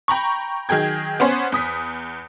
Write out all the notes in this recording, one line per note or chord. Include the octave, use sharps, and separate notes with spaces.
G5 A#5 B5 C#6
D#3 F#3 G#4 G5 G#6
B3 C#4 C5 C#5
E2 D#6 B6